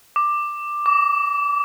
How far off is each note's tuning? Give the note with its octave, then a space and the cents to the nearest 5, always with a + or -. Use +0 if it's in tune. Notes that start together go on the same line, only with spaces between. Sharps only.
D6 +10
D6 -30